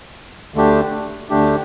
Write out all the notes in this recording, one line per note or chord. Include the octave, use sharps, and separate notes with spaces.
D2 D3 A3 D4 G4
D2 D3 A3 D4 G4